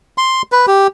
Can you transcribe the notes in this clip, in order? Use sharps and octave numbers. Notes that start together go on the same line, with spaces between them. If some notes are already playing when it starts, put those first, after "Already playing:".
C6
B4
G4